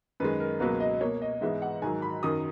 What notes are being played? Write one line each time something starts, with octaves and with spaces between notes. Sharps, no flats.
F#2 D#3 G#3 B4
A#4
C#2 B2 F#3 A#3 B4
D#5
B2 A#3 C#5
D#5
G#2 E3 G#3 B3 E5
F#5
G#2 D#3 F#3 G#5
B5
F#2 D#3 F#3 D#6